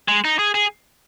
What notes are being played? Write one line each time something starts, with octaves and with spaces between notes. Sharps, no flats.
G#3
D#4
G#4
G#4